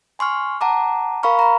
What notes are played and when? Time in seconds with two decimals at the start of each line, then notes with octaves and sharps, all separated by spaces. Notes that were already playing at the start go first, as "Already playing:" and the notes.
0.19 G#5 C6 C#6 F6
0.61 F#5 A5 A#5 D6
1.23 A#4 F5 A#5 B5 C#6 F6
1.39 A#5 B5